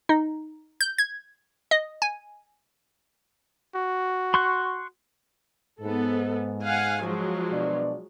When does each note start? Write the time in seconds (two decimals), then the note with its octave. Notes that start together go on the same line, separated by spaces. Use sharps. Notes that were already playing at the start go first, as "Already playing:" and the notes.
0.09 D#4
0.81 G6
0.98 G#6
1.71 D#5
2.02 G#5
3.75 F#4
4.34 C6 C#6 F#6
5.81 G#2 B3 A4
6.63 F5 F#5 G#5
7.04 F3 F#3 G#3
7.51 B2 D4 D5